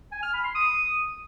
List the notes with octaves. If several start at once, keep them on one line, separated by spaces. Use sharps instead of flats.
G#5
F6
B5
C6
D#6